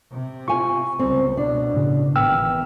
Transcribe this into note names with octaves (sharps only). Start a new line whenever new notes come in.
C3
F4 G#5 C#6
C#2 G3 C4
B2 D4
A2 C#3
G#1 E3 B3 G5 E6 F6